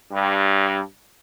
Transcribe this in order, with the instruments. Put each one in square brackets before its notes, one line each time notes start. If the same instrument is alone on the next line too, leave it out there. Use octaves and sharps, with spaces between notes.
[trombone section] G2